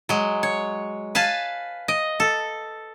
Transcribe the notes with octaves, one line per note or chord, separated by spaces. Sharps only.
F#3 G#3
C#5
B4 F5 G#5 A5
D#5
A4